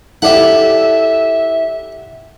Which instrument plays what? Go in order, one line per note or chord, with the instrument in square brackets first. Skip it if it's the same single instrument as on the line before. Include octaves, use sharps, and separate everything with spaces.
[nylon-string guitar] E4 A4 D5 [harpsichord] G4 F#5 [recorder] E5